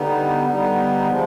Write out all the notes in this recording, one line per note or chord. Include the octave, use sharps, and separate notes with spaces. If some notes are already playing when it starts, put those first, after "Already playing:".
Already playing: D3 G3 B3 D#4
D3 G3 B3 D#4
F3 G#3